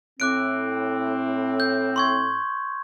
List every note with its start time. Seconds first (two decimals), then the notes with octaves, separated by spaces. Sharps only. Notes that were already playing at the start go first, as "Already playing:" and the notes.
0.20 A2 C4 D6 F#6 D7
1.60 G6
1.96 C6 C#6 G#6